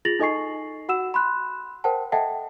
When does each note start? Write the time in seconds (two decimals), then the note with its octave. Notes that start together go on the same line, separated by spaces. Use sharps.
0.05 F4 G#4 A6 A#6 F7 F#7
0.19 D#4 A4 D#5 G#5 C#6 C7
0.89 F#4 F#5 E6 E7
1.14 B5 C6 F#6
1.84 A#4 C5 F#5 G5 A5
2.12 A4 D#5 E5 F#5 G5 A5